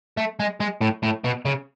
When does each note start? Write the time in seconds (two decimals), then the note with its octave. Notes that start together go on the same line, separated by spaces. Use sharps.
0.17 A3
0.40 G#3
0.60 G#3
0.81 A2
1.03 A2
1.24 B2
1.46 C#3